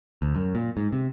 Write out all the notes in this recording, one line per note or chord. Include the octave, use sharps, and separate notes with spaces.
D2
F#2
A#2
G#2
C3